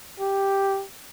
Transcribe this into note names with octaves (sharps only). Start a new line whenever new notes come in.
G4